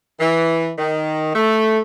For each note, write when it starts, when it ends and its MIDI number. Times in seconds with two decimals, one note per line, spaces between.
0.20 0.71 52
0.78 1.34 51
1.34 1.79 57